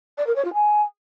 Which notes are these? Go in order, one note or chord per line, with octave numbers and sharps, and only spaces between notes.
D5
A#4
C#5
F4
G#5